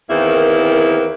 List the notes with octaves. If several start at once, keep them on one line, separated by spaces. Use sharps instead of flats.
E2 D#3 A#3 C4 E4